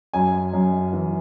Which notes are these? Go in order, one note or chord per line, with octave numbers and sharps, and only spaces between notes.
F#2 G#5
F#2
E3